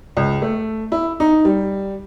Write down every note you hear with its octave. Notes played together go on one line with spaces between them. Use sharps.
C#2
A3
E4
D#4
G3